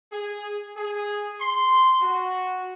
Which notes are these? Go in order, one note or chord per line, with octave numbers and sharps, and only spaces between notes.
G#4
G#4
C6
F#4